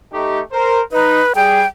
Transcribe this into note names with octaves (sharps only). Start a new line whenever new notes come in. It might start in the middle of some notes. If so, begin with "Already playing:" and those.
A3 D#4 G4
A#4 C5
D#4 B4
G3 G#4 G5